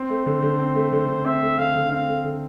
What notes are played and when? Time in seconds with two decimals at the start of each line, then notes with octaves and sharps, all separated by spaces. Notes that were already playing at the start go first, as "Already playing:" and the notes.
Already playing: C4 C5
0.10 A3
0.26 D3
0.42 D3
0.59 C4
0.76 A3
0.93 D3
1.08 D3
1.25 C4 E5
1.42 A3
1.58 D3 F5
1.75 D3
1.91 C4 F5
2.08 A3
2.24 D3